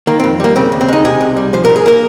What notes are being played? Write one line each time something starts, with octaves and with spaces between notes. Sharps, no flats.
D#3 A#3
F2 C4
G3 A#3
C#3 C4
D#2
C4
G#3 D#4
C3 G#4
C2
G3
F3 C5
G#2 A#4
G#4
A#3 A#4